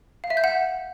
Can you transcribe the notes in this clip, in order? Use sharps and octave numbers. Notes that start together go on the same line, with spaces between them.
F5
E5
G6
F#5